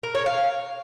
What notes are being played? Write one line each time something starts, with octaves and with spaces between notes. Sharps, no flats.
A#4
C#5
F5